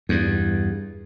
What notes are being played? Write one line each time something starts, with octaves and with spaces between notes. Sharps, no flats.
E2 G2